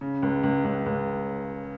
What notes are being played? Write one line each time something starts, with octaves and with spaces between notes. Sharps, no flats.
C#3
C#2
C#2
C#2
C#2